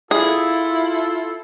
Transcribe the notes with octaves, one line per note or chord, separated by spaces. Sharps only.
E4 F4 G#4 A4